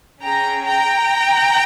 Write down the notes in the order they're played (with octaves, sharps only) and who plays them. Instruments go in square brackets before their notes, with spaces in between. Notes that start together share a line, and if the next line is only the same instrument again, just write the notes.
[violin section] C#4 G#4 G5 A#5
G5 A#5